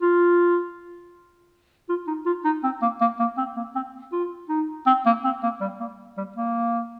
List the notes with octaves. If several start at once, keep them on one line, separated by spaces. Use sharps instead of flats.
F4
F4
D#4
F4
D#4
C4
A#3
A#3
A#3
C4
A#3
C4
F4
D#4
C4
A#3
C4
A#3
G3
A#3
G3
A#3